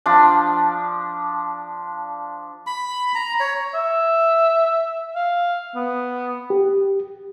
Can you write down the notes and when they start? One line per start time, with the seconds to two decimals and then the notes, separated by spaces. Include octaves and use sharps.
0.06 F3 D4
2.67 B5
3.15 A#5
3.40 C#5
3.74 E5
5.15 F5
5.75 B3
6.50 G4